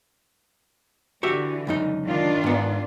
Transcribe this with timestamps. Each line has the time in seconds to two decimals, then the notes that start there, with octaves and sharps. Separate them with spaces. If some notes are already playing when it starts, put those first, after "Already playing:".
1.23 D3 E3 F#4 G4 E5
1.67 C#2 F#2 D#4
2.07 D#3 D4 F4
2.44 G#2 B3